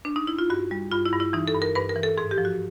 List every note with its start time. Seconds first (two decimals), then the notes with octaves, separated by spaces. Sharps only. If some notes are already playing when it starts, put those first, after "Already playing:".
0.05 D4
0.16 D#4
0.27 E4
0.39 F4
0.50 G2 F#4
0.71 G3
0.92 G2 F4
1.05 E4
1.13 G2
1.20 E4
1.33 E3 D#4
1.48 A4
1.54 G2
1.62 A#4
1.75 G2 B4
1.89 A#4
1.96 E3
2.03 A4
2.17 G#2 G#4
2.31 G4
2.38 F3
2.45 F#4